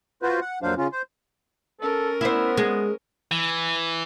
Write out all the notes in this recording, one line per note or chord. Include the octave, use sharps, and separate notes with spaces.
F4 F#4 B4 C5
F#5
F2 A#2 F#3 D4 C5 F5
C#3 C#4 F4
C5
C#4 A4 A#4
B3 E4 C5
G#3
E3